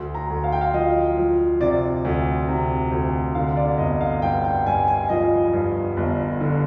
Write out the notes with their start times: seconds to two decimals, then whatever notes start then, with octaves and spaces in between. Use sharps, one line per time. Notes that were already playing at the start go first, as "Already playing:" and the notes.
Already playing: D2 C6
0.15 A#5
0.30 D2
0.44 F5
0.52 G5
0.61 F5
0.73 F3 D#5
1.17 F3
1.60 C3 D5
2.05 D2
2.48 C3
2.92 D2
3.35 D3 F5
3.57 D5
3.78 G1 D#5
4.01 F5
4.22 G2 G5
4.44 G5
4.66 G2 G#5
4.88 G#5
5.09 F3 D#5
5.53 G2
5.97 G1
6.40 D3